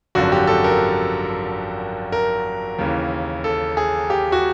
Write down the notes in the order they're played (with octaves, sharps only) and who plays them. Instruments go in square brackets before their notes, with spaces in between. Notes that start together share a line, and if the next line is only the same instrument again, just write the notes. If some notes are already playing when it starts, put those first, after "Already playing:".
[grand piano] G#1 F#2 D3 F3 F#4
G4
A4
A#4
A#4
D#2 C#3 E3
A4
G#4
G4
F#4